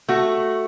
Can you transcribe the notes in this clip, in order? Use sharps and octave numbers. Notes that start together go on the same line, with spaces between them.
A3 F#4